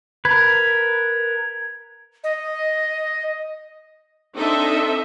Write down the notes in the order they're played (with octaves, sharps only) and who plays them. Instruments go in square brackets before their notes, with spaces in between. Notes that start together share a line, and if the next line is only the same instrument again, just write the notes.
[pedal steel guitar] A#4 B4 [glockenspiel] G#6
[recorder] D#5
[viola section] C4 D4 D#4 A4 D#5 E5